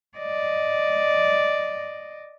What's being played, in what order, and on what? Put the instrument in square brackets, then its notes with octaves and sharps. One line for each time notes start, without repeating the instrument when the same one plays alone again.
[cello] D5 D#5